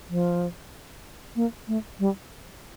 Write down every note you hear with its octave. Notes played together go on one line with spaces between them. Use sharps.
F3
A#3
A3
G3